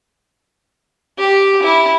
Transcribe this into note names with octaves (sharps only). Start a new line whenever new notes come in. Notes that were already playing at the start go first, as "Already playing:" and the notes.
G4
E4